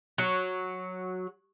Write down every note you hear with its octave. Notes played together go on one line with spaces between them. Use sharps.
F#3